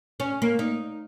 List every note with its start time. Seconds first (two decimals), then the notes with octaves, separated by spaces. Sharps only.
0.20 C#4
0.42 A#3
0.59 D#4